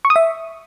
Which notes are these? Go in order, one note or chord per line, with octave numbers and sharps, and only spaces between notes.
C#6
D#6
E5